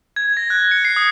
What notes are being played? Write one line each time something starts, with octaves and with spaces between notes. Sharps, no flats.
G#6
A#6
F#6
C#7
C7
D#6